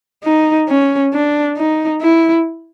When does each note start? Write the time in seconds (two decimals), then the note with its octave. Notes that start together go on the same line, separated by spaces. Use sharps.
0.24 D#4
0.68 C#4
1.13 D4
1.57 D#4
2.01 E4